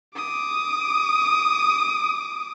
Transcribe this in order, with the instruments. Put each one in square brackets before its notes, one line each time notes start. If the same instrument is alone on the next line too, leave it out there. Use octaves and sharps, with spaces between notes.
[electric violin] D6 D#6